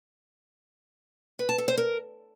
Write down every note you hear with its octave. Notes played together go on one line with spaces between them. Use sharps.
B4
A5
A4
C5
A#4